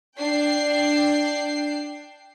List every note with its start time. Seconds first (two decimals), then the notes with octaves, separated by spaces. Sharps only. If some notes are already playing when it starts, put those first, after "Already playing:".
0.18 D4 G5 C7